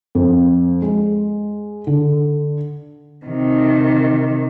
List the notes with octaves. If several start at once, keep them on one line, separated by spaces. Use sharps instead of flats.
F2
G#3
D3
C3 D#3